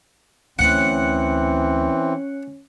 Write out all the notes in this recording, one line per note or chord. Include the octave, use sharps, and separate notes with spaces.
D2 E3 C4 C#4 F#5